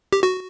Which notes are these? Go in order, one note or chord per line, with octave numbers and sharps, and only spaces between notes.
G4
F#4